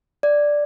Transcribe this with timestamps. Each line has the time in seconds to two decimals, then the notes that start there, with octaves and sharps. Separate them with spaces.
0.23 D5